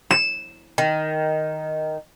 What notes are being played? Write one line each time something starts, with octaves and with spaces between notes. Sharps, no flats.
E7
D#3